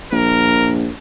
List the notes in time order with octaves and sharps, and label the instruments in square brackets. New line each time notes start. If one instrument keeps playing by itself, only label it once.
[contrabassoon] A#1 [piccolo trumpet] A#4